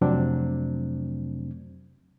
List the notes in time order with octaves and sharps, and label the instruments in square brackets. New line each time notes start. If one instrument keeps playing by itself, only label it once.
[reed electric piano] F2 C3 F#3 A3 C4 D4